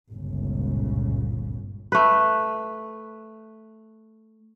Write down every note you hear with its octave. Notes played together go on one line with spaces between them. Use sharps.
G1 C#2 A#2 C#3
A3 B4